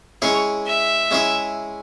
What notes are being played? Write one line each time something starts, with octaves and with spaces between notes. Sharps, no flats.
G#3 C#4 E4 G#4 C#5
E5
G#3 C#4 E4 G#4